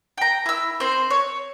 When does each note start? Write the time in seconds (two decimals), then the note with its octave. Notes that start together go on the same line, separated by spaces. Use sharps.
0.18 G5 A#5
0.46 E4 E6
0.80 C4 C5
1.10 C#5